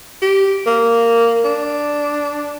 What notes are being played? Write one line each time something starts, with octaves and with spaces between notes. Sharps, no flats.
G4
A#3
D4